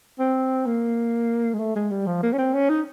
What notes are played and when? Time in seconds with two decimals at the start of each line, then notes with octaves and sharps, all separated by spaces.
0.19 C4
0.66 A#3
1.54 G#3
1.59 A3
1.76 G#3
1.91 G3
2.07 F3
2.23 A#3
2.33 C#4
2.38 C4
2.54 C#4
2.70 D#4